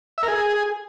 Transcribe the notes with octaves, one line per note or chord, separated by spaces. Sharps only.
E5
A#4
G#4